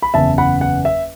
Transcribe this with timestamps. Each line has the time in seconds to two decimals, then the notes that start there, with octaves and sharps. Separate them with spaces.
0.02 B5
0.14 F#1 E2 C#3 E5 A5
0.38 F#5 B5
0.61 F#5
0.85 E5